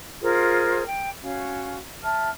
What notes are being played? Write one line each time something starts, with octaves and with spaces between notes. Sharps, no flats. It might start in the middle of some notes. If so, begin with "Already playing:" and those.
F4 G#4 A#4 C5
G5
C#4 F#4 F5
E5 A5 F6